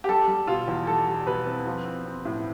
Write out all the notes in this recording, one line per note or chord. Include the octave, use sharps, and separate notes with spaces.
G4
G3 A4
G3
B2 F4
E2
G3 A4
G3
B2 B4
C4
F3
C4
C4
A2